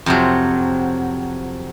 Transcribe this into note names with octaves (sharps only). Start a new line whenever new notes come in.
F2 C3 F#3